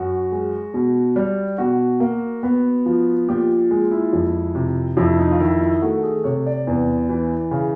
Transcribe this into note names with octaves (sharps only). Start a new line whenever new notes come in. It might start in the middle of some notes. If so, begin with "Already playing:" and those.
Already playing: F#2 F#4
G#3
B2
G3
B2 F#4
A#3
B3
F3
A#2 G4
G#3
E4
F2
C3
F2 E4
D#4
F4
D#3 E4
E4
A3 F#4
G#4
C3 C#5
D5
E2
E3
C#3